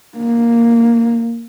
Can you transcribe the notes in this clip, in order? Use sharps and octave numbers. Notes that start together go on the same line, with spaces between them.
A#3